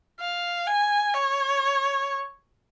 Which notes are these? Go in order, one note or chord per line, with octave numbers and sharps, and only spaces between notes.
F5
G#5
C#5